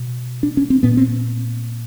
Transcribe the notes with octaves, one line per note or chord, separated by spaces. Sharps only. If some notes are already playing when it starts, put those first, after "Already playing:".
Already playing: B2
D4
C#4
C4
A#2 B3
C4